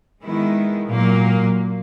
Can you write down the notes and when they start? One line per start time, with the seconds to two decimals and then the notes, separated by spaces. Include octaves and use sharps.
0.23 D#3 G#3 B3 E4
0.90 A#2 F#3 A#3